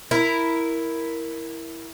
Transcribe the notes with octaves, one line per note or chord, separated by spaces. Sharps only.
E4 A#4